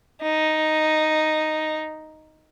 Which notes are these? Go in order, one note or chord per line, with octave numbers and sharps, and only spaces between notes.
D#4